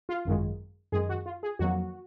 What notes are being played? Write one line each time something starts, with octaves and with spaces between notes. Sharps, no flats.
F4
G#1 F#2 D#3 G#3
F#2 D#3 G#3 G#4
F#4
F4
G#4
F2 D#3 F#3 A#3 F#4